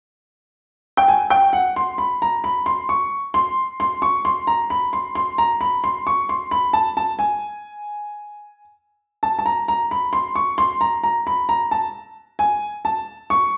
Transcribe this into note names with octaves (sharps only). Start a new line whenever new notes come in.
G5
G#5
G5
F#5
C6
B5
A#5
B5
C6
C#6
C6
C6
C#6
C6
A#5
B5
C6
C6
A#5
B5
C6
C#6
C6
B5
A5
A5
G#5
A5
A5
A#5
A#5
B5
C6
C#6
C6
A#5
A#5
B5
A#5
A5
G#5
A5
C#6